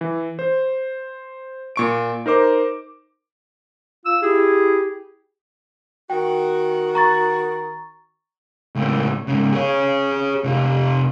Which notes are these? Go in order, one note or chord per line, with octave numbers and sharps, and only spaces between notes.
E3
C5
A#2 C#6 D7
D#4 A#4 C5 D6
F4 E6
E4 G4 G#4
D#3 F#4 G5
A#5 C#6 A6
C#2 A2
G#2 C#3
G#4 C#5
C3 F4